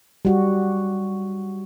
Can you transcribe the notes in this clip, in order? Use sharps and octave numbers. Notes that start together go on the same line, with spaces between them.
G3 F#4